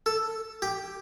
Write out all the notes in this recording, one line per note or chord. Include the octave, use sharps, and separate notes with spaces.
A4
G4